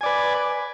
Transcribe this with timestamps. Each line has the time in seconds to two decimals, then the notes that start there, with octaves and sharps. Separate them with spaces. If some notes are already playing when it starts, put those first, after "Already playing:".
0.01 G#5
0.03 D5
0.06 B4